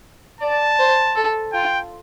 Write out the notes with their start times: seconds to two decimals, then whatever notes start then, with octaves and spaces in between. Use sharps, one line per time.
0.41 D5 A5
0.79 C5
1.16 A4
1.53 F4 G5